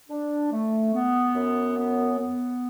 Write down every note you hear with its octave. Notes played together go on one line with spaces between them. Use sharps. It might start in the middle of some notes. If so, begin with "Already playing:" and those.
D4
A3
B3
F#2
B3
B3